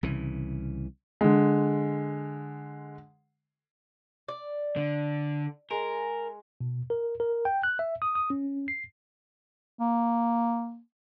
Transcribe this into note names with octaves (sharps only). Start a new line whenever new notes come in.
C2 C#3 E3
D3 G#3
D5
D3
G#3 A#4
B2
A#4
A#4
G5
F#6
E5
D#6
D#6
C#4
C7
A#3